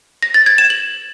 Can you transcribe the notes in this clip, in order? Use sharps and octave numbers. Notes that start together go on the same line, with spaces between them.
A#6
A6
G#6
E7
F#7